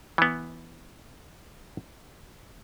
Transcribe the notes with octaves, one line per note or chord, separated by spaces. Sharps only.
E3 B3